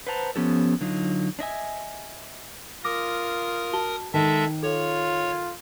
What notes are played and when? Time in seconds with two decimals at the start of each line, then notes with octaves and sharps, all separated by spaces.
0.07 B4 C5 F#5 A5 A#5
0.36 F3 B3 C#4 G4 A4
0.81 D3 F#3 D#4 F4
1.39 D4 D#5 E5 G#5
2.84 F4 A#4 D6 D#6 A#6
3.73 F#4 A5 G7
4.14 D#3 G#3 A4 E5 A5
4.63 F4 A4 C#5